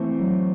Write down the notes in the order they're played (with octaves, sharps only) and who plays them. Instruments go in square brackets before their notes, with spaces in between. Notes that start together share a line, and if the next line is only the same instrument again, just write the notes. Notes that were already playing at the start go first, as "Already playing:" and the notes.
Already playing: [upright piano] E3 A3 C4
[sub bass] F#3